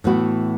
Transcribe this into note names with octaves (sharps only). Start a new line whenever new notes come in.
A2 E3 B3 F#4